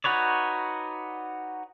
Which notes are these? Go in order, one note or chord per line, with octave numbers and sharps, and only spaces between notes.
D#4 F#4 B4 C#5 D5